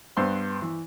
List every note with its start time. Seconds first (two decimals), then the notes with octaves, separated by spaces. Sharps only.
0.17 G2 B3 C5 C6 E6
0.62 E3